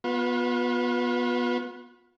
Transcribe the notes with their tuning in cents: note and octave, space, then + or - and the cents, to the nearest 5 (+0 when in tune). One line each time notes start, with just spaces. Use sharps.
B3 -10 F4 +40